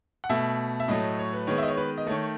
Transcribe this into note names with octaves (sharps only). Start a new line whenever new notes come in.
F#5
B2 A3 E5
E5
A2 F#3 A3 D#5
C#5
B4
D#3 G#3 B3 C#5
D#5 E5
C#5
B4
D#5
D#3 A3 C#5